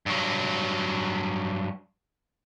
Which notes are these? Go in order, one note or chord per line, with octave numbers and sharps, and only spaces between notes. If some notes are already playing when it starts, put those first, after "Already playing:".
G2 F#3